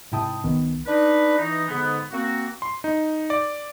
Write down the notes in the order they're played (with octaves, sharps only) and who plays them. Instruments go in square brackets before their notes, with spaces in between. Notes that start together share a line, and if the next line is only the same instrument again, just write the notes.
[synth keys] G#2 C3 E4 G5 A5 D#6
C2 D#3 B3
[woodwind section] D4 D#4 B4
E3 D#4
G#2 D3 B3
A#3 C4 F#4
[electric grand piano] C6
D#4
D5